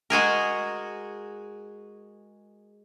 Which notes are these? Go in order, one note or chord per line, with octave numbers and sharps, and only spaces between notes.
G#3 F#4 G#4 A#4